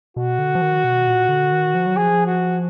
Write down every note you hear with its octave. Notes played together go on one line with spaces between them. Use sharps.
B2 F#4
D3
F3
D#3
B2
A#2
D3
D#3
F3
F#3
F3 G#4
F#4